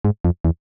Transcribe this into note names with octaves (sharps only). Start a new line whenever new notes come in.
G#2
F2
E2